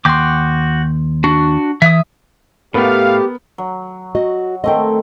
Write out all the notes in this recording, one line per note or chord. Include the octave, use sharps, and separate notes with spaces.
D#2 F#4 G5 C6 D6
D4 F#4
E3 E5 D#6
A2 A3 B3 G4 A#4 F5
F#3
F#4 D#5
D#3 A3 C4 D#5 G5